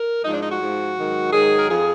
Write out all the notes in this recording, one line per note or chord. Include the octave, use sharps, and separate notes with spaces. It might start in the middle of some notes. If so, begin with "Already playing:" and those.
Already playing: A#4
G#2 F3 D#4
D4
D#4
F#4
G#2 F3
G#2 D#3 F#3
G#2 D#3 F#3 G#4
A#4
F2 F3 G#4